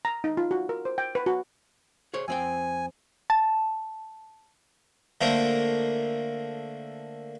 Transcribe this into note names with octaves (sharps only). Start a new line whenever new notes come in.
A#5
D#4
F4
F#4
A#4
C5
G5
B4
F#4
G#4 C5 C#5
F2 C4 G5 G#5
A5
D3 A3 A#3 A#4 C5